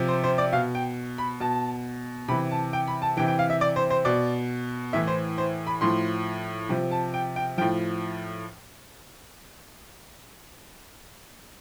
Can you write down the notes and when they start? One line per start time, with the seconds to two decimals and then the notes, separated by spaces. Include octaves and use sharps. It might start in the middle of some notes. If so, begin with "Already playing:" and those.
Already playing: C3 F3
0.08 C5
0.24 C5
0.38 D5
0.53 B2 F5
0.75 G5
1.18 B5
1.40 B2 A5
2.28 C3 B5
2.31 E3
2.51 A5
2.73 G5
2.88 B5
3.02 A5
3.17 C3 E3 G5
3.28 G5
3.39 F5
3.50 E5
3.61 D5
3.76 C5
3.90 C5
4.05 B2 D5
4.93 A2 E3 E5
5.07 C5
5.38 C5
5.67 B5
5.81 A2 F3 C6
6.69 C3 F3
6.91 A5
7.14 G5
7.36 G5
7.58 F3 G5
7.61 A2